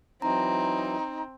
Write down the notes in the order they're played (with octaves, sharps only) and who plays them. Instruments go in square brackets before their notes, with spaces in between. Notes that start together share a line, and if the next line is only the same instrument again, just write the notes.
[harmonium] E3 F#3 E4 [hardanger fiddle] C4 [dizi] D#4 [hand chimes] A#5